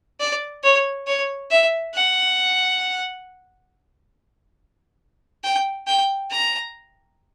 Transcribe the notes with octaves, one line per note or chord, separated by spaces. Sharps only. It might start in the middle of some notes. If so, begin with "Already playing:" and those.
D5
C#5
C#5
E5
F#5
G5
G5
A#5